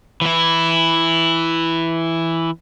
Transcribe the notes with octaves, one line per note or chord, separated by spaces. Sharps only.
E3 E4